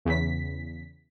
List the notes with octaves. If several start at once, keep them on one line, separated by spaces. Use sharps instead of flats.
E2 C#3 B6